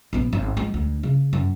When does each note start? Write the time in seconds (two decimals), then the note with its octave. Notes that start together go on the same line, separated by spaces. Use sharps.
0.13 A#1 B3
0.33 G#1
0.57 F3 G#3
0.74 D2
1.03 C#3
1.33 F#2